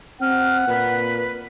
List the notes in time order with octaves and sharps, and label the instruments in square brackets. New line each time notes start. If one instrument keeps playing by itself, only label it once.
[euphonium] C4 [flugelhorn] F#5 [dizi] F6
[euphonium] A#2 [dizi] B4